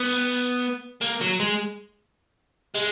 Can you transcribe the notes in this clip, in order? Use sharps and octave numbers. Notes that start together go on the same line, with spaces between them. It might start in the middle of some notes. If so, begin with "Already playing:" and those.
Already playing: B3
A#3
F#3
G#3
G#3